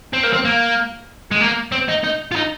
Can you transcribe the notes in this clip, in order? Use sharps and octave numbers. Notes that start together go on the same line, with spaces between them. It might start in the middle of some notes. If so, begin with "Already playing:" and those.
C4
A#3
C4
A#3
G#3
A#3
C4
D#4
D#4
F4
D#4